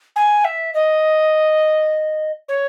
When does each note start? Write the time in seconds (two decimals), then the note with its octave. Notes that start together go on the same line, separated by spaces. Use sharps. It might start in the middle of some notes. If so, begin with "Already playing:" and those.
0.16 G#5
0.45 E5
0.74 D#5
2.48 C#5